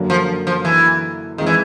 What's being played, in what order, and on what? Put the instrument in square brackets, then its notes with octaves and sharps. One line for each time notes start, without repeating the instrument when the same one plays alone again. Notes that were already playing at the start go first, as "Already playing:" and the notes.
Already playing: [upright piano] F#2 D3 F#3 A#3
[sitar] F3
F3
E3
[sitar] D#3 [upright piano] F3 G#3 C4 F4 G#4
[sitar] E3